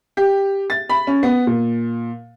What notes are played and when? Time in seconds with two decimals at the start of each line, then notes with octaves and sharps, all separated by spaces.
0.17 G4
0.70 A6
0.90 B5
1.07 C#4
1.23 B3
1.47 A#2